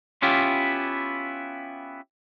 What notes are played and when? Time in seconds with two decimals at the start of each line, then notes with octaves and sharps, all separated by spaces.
0.22 B3 C#4 E4 F4 G4